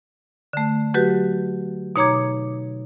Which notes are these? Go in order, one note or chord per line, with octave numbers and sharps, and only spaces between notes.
D3 A3
F#3 F#4 G4 B4
B2 D#4 C#5 A#5 D6 G#6